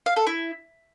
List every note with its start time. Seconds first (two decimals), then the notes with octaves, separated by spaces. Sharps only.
0.06 F5
0.16 A4
0.27 E4